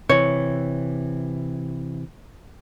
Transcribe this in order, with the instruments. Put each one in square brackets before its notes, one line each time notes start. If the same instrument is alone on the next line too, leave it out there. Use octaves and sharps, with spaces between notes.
[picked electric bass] C3 E3 [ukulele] C#5